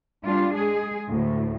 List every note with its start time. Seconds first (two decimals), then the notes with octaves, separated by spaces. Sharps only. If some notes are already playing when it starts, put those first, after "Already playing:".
0.23 G3 D4 F4
0.54 G#3 G#4
1.09 D2 A2